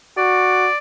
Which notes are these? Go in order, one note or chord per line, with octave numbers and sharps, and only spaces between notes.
F#4 D5